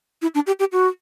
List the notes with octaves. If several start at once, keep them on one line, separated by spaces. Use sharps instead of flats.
E4
D4
G4
G4
F#4